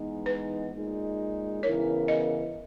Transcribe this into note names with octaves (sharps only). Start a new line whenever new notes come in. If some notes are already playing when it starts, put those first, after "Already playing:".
Already playing: E3 G#3 B3 D#4
B4
A#2 G#3 D#4
C#3 E3 B3 E4 A#4 C#5
D#5